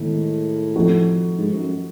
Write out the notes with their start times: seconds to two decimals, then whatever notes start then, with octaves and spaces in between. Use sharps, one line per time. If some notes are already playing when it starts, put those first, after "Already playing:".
Already playing: A2 D#3 G#3 B3
0.76 F3 A3 C4 D#4 F#4
1.38 G#2
1.54 F#2